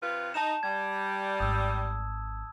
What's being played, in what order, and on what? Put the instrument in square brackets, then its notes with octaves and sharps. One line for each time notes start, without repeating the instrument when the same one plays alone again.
[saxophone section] C3 F4 B4
[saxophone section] D#4 [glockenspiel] A5 E7
[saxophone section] G3 [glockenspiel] G#6
[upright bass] G#1 [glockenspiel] D#6 E6